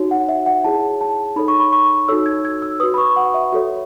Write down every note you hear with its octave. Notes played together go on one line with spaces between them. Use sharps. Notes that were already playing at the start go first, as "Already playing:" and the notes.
Already playing: D#4 F#4 C#5
F#5
E5
F#5
E4 G#4 C#5 A5
A5
D#4 A4 C#5 B5
C#6
B5
C#6
D#4 F#4 A4 C#5 E6
G#6
G#6
E6
F#4 B4 D#6
B5
C#6
F#5
E5
F#4 A4 C#5